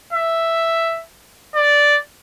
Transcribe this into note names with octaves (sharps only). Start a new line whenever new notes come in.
E5
D5